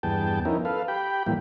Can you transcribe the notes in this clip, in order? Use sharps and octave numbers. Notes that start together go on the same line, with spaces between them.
E2 G2 B3 G#4 G5 A5
F3 B3 C#4 D#4 E4 A#4
A4 B4 F5
G4 G5 B5
A2 E3 F3 G3 A#3